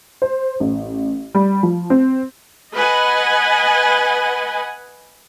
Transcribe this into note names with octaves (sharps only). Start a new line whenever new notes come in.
C5
A1
G3
F3
C4
B4 D#5 F#5 G#5